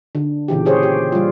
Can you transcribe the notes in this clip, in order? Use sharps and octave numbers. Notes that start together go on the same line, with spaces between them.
D3
A#2 C#3 E3 G4
G4 G#4 C5 C#5
G4
G3 F4